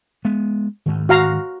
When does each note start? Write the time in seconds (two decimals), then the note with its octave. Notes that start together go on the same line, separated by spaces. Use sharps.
0.25 G#3 B3
0.86 D2 G#2 D#3
1.09 F#4 F5 A#5